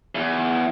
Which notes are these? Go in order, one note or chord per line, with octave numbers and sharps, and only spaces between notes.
E2